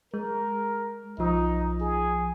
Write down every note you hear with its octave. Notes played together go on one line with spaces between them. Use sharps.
G#3 A#4
B1 F3 D#4
G#4